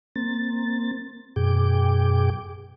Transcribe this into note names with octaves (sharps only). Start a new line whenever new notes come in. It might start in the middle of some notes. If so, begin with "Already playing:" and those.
A#3 C4 A6
F#2 B2 G#4 G5 D6